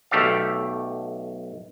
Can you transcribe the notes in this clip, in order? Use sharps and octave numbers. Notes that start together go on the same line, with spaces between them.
B1 A3 G4 A4 D5 F5